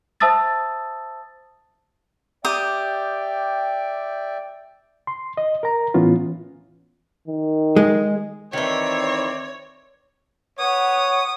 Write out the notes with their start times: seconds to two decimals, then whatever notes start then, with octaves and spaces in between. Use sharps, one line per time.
0.20 C5 E5 A5 D#6 E6 A6
2.45 G4 D5 E5 G5 D#6
5.07 C6
5.37 D#5
5.63 A#4 A#5
5.94 A2 E3 B3 C#4 F4
7.28 D#3
7.76 G#3
8.53 D#3 E3 C4 C#5 D5
10.59 B4 C#5 F#5 D#6